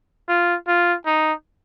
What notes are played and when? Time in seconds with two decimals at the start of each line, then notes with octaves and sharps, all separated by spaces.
0.29 F4
0.68 F4
1.06 D#4